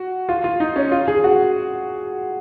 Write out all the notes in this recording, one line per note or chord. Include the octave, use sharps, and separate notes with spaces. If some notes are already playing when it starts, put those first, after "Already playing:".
Already playing: F#4
F4
F4
D#4
C#4
F4
G#4
F#4